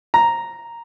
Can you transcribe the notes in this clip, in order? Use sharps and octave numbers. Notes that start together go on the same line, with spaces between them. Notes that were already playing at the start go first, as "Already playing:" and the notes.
A#5